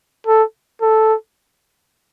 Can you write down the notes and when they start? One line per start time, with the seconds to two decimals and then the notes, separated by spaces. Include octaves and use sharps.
0.27 A4
0.82 A4